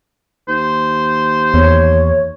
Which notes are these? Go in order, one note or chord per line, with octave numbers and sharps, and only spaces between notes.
D#2 C5
E2 C#5